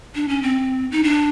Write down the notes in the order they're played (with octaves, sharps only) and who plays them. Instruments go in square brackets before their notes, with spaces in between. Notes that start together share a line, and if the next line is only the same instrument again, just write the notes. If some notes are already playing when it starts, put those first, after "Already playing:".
[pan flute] D4
C#4
C4
D#4
D4